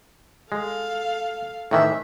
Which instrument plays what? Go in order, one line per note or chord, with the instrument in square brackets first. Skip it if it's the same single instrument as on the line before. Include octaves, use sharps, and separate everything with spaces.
[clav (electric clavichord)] G#3 [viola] A4 F5
[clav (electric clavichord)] A2 D#3 E3 [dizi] E5